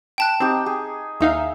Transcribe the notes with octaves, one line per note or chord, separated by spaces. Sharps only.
G5 A5 F#6
C4 D#4 G4
G#4
D#2 D#4 E5 F5